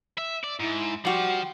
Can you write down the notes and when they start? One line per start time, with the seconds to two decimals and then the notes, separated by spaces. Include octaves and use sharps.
0.18 E5
0.44 D5
0.60 G#2 E4
1.05 F3 G3 F#4 G5